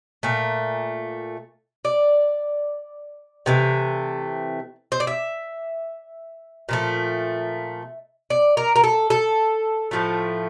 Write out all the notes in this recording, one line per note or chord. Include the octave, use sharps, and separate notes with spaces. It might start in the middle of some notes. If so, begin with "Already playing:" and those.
A#2 A3
D5
C3 E3 A3
C5
D5
E5
A#2 F3 A3
D5
A#4
A#4
A4
A4
A2 F3 A3